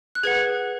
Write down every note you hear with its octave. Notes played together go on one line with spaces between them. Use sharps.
F#6
G#4 B4 F#5 G#6